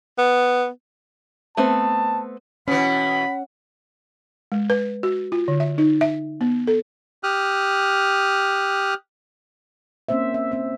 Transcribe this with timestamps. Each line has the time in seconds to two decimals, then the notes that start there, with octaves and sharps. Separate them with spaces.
0.18 B3
1.57 A3 B3 C4 A5
2.68 B2 E3 C#4 F#5 B5
4.52 G#3
4.70 B4
5.03 F#4
5.32 F4
5.48 D3
5.60 E5
5.78 D#4
6.01 E5
6.41 B3
6.67 A4
7.23 G4 D#6 F6 F#6
10.09 A#3 C4 C#4 C5 E5
10.34 E5
10.52 C4 E5